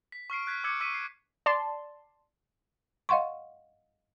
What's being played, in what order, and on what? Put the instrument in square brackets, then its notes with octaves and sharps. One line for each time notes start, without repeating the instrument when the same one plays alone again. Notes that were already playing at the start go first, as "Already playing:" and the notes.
[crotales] B6
C#6 F6 C7 D7
F#6 G#6 B6
C#6 D6 E6 G#6 C#7
C#6 E6 B6 D#7
C7
[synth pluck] D5 A5 C6
[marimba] D#5 F5 F#5 C6 C#6